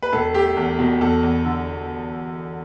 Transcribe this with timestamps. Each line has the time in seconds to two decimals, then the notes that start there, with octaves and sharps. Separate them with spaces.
0.02 B4
0.12 E1 A4
0.34 A3 G4
0.57 E2
0.79 B2
1.01 E2 A4
1.23 E2
1.45 D3